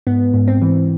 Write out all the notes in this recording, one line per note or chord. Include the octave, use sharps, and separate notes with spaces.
G#2 B3
G#2
C4
E3